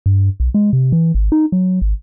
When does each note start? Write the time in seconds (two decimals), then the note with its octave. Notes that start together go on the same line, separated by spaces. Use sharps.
0.06 G2
0.40 B1
0.54 G#3
0.73 C3
0.92 E3
1.15 G#1
1.32 D#4
1.52 F#3
1.81 G#1